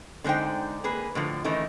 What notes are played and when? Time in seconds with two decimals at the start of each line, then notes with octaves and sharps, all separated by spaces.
0.24 D3 G#3 D#4 C5 G5
0.84 A#3 G#4 B4
1.15 A2 D3 F3
1.44 D#3 E3 A3 C#4 D#4